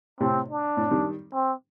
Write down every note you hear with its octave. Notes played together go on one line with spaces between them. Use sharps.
A2 C3 C4
D4
A2
D#3 G3
C4